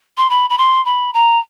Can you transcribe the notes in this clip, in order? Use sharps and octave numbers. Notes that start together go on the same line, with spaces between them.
C6
B5
B5
C6
B5
A#5